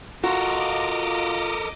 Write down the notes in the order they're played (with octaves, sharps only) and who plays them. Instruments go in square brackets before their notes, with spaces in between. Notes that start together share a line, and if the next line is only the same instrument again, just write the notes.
[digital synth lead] F4 [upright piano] F#4 [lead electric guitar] A4 A#4 [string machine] D#5 D6